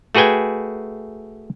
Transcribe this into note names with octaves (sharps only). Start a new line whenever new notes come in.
A3 F#4 G#4 B4 G5 G#5